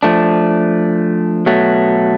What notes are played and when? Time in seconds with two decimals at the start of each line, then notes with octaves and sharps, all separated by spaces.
0.03 F3 A3 D4
1.46 B2 F#3 A3